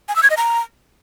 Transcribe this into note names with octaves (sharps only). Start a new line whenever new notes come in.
G#5
E6
G#6
D#5
A#5